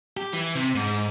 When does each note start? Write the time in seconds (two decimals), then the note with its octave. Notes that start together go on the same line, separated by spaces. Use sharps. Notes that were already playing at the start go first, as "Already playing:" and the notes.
0.17 G4
0.33 E3
0.55 C3
0.75 G#2